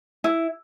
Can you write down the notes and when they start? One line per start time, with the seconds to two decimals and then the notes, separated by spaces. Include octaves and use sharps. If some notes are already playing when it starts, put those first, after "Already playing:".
0.24 E4